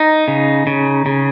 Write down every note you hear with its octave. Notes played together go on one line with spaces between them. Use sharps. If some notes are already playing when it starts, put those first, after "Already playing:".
Already playing: D#4
C#3
C#3
C#3